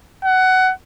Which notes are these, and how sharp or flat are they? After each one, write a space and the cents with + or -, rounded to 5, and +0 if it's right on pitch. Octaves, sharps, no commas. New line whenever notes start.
F#5 +15